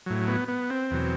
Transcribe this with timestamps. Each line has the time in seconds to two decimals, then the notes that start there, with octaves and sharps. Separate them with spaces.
0.06 A2 F#3
0.28 B3
0.48 B3
0.70 C4
0.91 E2 B2 F#3